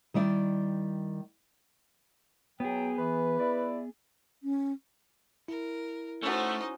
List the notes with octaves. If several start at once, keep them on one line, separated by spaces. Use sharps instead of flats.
D#3 G3 E4 D5
F#3 B3 G#4 G5
E3 B4
E4 D5
C#4
E4 A#4
A3 C#4 D#4 F#4 C5